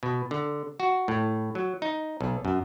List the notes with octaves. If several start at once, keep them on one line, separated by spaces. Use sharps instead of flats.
B2
D3
F#4
A2
F#3
D#4
B1
F#2